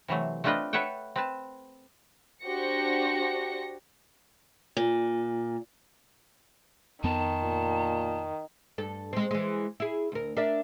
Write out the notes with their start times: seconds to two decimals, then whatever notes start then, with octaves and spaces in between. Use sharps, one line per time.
0.08 C3 E3 F#3 A3
0.44 A3 C4 D4 F4 B4 D#5
0.73 A4 B4 C#5 E5 F#5 G5
1.16 C4 B4 A5
2.44 D4 F#4 G4 C5 A#6 C#7
4.77 A#2
7.04 F2 D#3 B3 A5
7.43 A#2
8.78 G2 A4
9.13 G#3 C4
9.31 E3 G#3
9.80 E4 G#4
10.12 D2 A#4
10.37 D4 A#4 E5